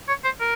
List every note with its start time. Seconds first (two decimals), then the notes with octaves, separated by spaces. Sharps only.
0.09 C#5
0.25 C5
0.40 A#4